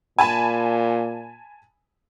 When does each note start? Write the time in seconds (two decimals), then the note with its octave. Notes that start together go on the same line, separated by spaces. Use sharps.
0.19 A#2 G#5 A5 B5